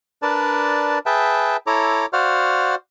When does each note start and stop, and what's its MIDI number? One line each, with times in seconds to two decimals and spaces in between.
0.22 0.99 62
0.22 0.99 70
0.22 0.99 71
0.22 0.99 74
0.22 0.99 81
1.06 1.57 68
1.06 1.57 71
1.06 1.57 76
1.06 1.57 79
1.06 1.57 81
1.67 2.06 64
1.67 2.06 69
1.67 2.06 73
1.67 2.06 82
1.67 2.06 86
2.13 2.75 66
2.13 2.75 72
2.13 2.75 74
2.13 2.75 77
2.13 2.75 78
2.13 2.75 89